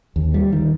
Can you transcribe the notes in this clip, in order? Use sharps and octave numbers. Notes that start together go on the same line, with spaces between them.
D#2
G3
D#3